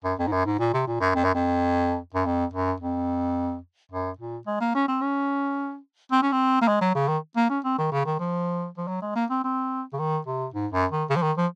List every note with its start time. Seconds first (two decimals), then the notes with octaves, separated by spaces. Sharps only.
0.04 F#2
0.19 F2
0.27 G#2
0.32 F#2
0.46 G#2
0.59 A#2
0.73 C3
0.87 A#2
1.01 F#2
1.15 F2
1.24 F#2
1.34 F2
2.14 F#2
2.25 F2
2.53 F#2
2.80 F2
3.91 F#2
4.18 A#2
4.47 G#3
4.60 A#3
4.75 C#4
4.88 C4
5.01 C#4
6.12 C4
6.22 C#4
6.32 C4
6.61 A#3
6.68 G#3
6.81 F#3
6.95 C#3
7.08 D#3
7.36 A#3
7.50 C#4
7.64 C4
7.78 D#3
7.92 C#3
8.06 D#3
8.20 F3
8.78 F3
8.88 F#3
9.02 G#3
9.15 A#3
9.30 C4
9.44 C4
9.93 C#3
9.99 D#3
10.27 C3
10.54 G#2
10.73 F#2
10.91 D#3
11.10 C#3
11.16 F3
11.22 D#3
11.37 F3